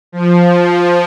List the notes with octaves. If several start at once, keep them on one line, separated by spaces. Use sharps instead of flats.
F3